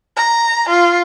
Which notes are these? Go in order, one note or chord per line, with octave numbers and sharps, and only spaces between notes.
A#5
F4